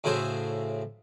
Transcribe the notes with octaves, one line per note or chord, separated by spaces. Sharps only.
A2 C#3 F#4 G#4 C5 E5